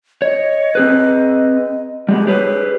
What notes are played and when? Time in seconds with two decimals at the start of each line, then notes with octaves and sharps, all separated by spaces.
0.22 C#5 D#5
0.75 C4 G#4 B4
2.09 G3 G#3 B3 G4
2.27 G4 G#4 B4 C#5